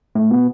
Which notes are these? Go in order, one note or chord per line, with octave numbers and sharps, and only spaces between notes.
A2
B2